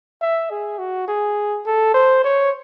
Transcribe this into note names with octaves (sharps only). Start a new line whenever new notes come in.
E5
G#4
F#4
G#4
A4
C5
C#5